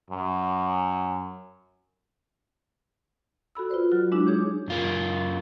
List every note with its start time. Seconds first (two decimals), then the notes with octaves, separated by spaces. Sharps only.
0.10 F#2
3.55 F#4 A4 B5 E6
3.69 F4 B4 C5 D5
3.91 F#3 F#4 F6
4.12 G#3 D4 E4 F#4
4.27 D#4 G#4 C#5 D6 G6
4.68 F#2 F4 A#4